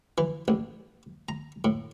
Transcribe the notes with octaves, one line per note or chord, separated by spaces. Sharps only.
E3
A1
A#5
A2